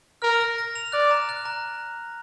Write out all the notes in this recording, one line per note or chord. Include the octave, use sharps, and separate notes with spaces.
A#4 F6
A#6
A#6
F7
D5 F#6
A#5
F#6
A#5